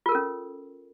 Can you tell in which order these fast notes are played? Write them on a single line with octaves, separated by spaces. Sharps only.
F4 A#4 A4 C#4